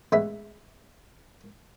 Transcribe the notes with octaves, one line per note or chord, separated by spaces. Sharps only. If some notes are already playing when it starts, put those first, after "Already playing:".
A1 G#3 B3 E5 B5